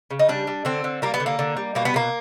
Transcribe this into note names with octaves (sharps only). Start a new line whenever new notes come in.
C#3
D#4
G3 D4
G3
D3 C4
D3
G3 A#3
B3
D3
A#3
D3
G3
B2 A#3
B3
B2 A#3